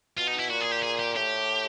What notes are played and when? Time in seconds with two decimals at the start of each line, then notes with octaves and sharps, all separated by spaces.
0.17 B2 F4
0.27 D#4
0.39 E4
0.49 A#2 F#4
0.61 G#4
0.72 G4
0.83 G#4
0.99 G4
1.16 A2 G4